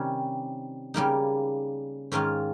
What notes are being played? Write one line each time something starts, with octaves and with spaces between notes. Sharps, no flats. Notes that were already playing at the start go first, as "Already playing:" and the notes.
Already playing: C3 D#3 G3 C#4
C#3 G3 A#3 D#4
G#2 D#3 A#3 C#4 F4